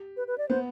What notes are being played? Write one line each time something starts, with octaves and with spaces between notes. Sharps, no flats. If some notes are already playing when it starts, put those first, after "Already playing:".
Already playing: G4
B4
B4
D5
B3 C5